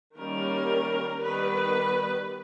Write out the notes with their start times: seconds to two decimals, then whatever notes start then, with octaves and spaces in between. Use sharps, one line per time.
0.16 D#3 G3 A#3 C#4 A#4
1.21 D#3 G3 B3 B4